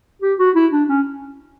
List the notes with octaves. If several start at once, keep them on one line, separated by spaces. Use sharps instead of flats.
G4
F#4
E4
D4
C#4